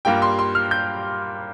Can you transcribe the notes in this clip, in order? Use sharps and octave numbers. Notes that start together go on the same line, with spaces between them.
G2 G3 A#3 F4 G5
C6
C6
F6
G6